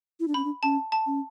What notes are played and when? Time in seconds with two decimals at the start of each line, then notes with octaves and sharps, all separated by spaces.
0.20 E4
0.28 D4
0.34 C#4 B5
0.44 D4
0.63 C#4 A5
0.92 A5
1.06 C#4